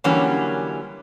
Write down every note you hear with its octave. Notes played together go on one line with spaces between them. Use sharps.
D3 E3 F#3 G3 A#3 C#4